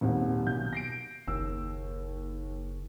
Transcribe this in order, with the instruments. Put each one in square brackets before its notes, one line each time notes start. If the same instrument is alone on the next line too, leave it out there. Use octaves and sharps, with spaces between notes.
[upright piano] D#1 G#1
B1 G6
A#6 C7 D7
[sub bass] F#1 [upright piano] D#2 E6